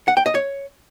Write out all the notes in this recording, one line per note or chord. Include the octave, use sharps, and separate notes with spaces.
F#5
G5
D#5
C#5